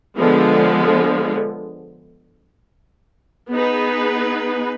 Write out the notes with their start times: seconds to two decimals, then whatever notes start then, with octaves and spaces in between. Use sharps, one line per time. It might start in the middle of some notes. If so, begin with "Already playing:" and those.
0.17 D3 F3 G#3 B3
3.50 B3 D#4 G#4 B4